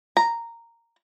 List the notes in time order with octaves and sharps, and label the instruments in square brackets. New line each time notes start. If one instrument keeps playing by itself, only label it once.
[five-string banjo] A#5